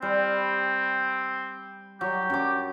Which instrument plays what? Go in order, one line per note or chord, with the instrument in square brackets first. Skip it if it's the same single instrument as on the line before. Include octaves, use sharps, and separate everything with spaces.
[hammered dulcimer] G3 [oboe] C4
[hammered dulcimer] F#3 [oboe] G4
[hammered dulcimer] F#2 D6